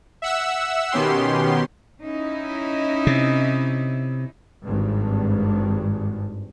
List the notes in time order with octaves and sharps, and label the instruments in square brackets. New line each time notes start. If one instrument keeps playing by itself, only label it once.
[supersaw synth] E5 F#5 E6
B2 D#3 B3 C#4 G4 C6
[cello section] C#4 D#4 E4
[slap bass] C3
[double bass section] G#1 G2